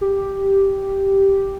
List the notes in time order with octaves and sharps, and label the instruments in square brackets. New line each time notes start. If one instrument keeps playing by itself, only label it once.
[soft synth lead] G4